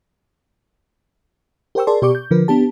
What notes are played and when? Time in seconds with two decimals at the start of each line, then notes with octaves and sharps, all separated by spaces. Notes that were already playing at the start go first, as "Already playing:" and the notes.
1.75 G4 A#4 C5 G5 C#6 E6
1.87 G#4 A#4 D5 A5 C6
2.02 B2 G4 D5 C#6 D6
2.15 G6
2.31 D3 F3 A#4 B4
2.48 B3 D4 G4 A5